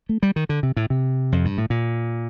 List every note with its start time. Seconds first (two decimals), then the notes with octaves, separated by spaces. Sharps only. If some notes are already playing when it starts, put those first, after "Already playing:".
0.09 A3
0.23 G3
0.36 D#3
0.49 D3
0.63 C3
0.76 A2
0.90 C3
1.32 F2
1.45 G2
1.58 A2
1.70 A#2